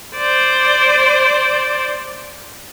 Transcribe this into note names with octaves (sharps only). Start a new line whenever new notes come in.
C5 D5